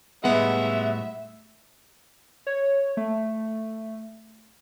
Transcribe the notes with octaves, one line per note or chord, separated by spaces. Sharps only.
A2 G3 G#3 B3 E5 F#5
C#5
A3